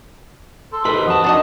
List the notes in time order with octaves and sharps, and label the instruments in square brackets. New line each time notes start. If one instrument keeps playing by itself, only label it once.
[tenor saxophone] A4 [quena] C6
[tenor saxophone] D#3 [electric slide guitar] G4 B4 C5 [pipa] B5
[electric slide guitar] F2 A5 [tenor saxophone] F#4 [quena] D#6
[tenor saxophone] D#3 [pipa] D4 F#4 D#5